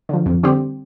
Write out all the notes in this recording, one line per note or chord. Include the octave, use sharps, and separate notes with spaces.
D3 F3
F2
D3 G3 C4 G4